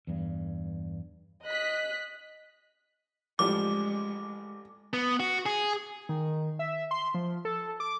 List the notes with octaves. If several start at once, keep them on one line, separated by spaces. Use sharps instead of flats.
E2 G2
D#5 F#6 B6
A1 F3 G3 G#3 D6
B3
F#4
G#4
D#3
E5
C6
F3
A4
D6